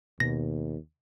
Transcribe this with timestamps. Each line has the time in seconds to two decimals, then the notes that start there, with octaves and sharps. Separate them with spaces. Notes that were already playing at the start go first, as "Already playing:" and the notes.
0.20 D#2 B2 A#6